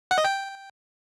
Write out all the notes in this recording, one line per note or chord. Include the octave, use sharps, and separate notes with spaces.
F#5
D#5
G5